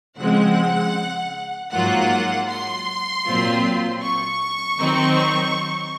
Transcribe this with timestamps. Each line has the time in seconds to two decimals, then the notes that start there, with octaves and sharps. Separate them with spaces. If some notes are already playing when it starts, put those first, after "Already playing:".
0.17 C#3 F3 G#3 C4 F#5
1.71 G#2 F#3 A#3 F4 F#5
2.48 C6
3.25 A#2 F#3 C4 F4
4.02 C#6
4.79 D#3 F#3 C4 D#4